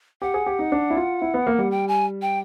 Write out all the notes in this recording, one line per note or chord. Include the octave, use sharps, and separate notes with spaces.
G4 F#5
G#4
G4
D#4
D4
E4
F4
E4
B3
A#3
G3
G5
G#5
G5